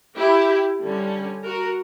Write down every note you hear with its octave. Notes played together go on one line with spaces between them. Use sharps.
E4 G4
D3 G3 C#4
F#4 A#4